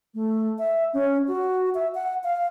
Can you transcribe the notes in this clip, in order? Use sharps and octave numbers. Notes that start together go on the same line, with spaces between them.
A3
E5
C#4
F#4
E5
F#5
F5